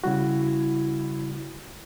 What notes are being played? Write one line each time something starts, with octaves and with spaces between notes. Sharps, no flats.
C#3 G3 E4 F#4